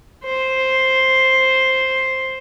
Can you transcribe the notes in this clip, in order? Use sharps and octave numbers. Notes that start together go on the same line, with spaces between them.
C5